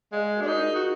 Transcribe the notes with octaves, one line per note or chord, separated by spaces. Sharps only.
G#3 D5 F5
F#4 A#4
D4
D#4
F4 G#4
F#4